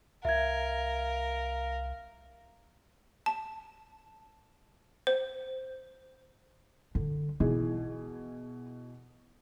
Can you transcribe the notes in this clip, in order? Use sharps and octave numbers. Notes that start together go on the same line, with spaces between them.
C2 A#4 E5 F5 G#6
A5
C5
D3
B2 E3 D#4 G#4